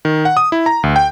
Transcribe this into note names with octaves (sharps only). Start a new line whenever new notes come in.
D#3
F#5
D#6
E4
A#5
D2
G5